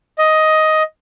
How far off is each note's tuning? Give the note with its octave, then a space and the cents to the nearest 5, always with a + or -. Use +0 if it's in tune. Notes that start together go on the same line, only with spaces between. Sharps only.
D#5 +10